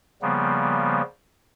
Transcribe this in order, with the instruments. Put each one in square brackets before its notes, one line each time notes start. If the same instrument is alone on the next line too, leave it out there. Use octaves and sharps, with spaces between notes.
[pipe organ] C#3 F3 G3 A#3 B3